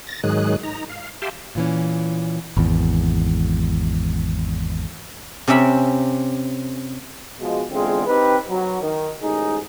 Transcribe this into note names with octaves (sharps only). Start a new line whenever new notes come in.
A6 A#6
G#2 D#3 F#3 G#3 G#4 F#6
D#4 A#5
F5
G4 E5 F5 G5 A5 C6
A#2 E3 C#4
G#1 E2
C3 C4 C#4 E5 B5
B2 F3 G#3
E2 D3 G#3 C4 F4
C4 D#4 G4 B4
F#3
D#3
A1 G#2 D#4 G#4